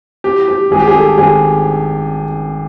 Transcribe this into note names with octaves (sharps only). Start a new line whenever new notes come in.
E3 G4
G4
G#1 G#4
G4
G#4
A4
G#1 G#4